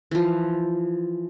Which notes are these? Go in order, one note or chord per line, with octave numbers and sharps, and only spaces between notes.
E3 F3